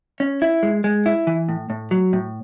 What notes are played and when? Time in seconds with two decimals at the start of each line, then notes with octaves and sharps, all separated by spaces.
0.20 C#4
0.42 E4
0.63 G#3
0.84 G#3
1.06 E4
1.27 E3
1.49 A2
1.70 A2
1.91 F#3
2.13 A2